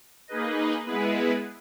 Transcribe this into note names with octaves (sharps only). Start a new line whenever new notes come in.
A#3 D#4 G#4 B4 D#5
G#3 B3 E4 G#4 B4